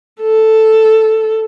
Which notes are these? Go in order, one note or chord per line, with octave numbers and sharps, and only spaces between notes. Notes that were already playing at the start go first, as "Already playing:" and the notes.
A4